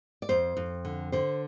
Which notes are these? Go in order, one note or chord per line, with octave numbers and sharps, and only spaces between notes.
D5
F2 C5
F2
D3
D3 C5